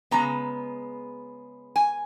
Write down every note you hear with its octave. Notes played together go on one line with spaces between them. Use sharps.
C#3 G#3 B3 A#5
G#5